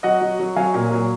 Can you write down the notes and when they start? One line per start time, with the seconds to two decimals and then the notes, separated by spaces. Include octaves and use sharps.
0.03 F#3 D#5 F#5
0.21 F#3
0.39 F#3
0.56 F#3 F5 G#5
0.74 A#2
0.91 F#3